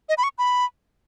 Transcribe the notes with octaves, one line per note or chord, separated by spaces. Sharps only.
D#5
B5
C#6
B5